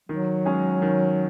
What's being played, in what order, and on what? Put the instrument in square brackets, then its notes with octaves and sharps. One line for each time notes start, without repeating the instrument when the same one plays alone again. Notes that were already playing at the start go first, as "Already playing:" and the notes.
[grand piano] D#3 [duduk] F#3
[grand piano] G#3 C#4 G#4
D#3